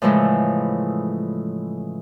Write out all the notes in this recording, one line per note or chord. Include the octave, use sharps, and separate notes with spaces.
A2 C#3 E3 F3 G#3 A3